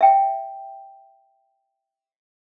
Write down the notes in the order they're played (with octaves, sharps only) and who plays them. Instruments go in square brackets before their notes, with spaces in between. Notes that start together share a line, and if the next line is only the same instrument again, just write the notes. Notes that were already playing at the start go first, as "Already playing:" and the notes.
[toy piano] E5 G5